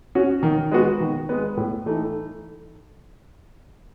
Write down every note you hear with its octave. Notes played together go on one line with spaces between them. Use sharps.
C#4 F#4
D#3
G#3 B3 F#4
D#3
G#3 B3
A2
E3 A3 D#4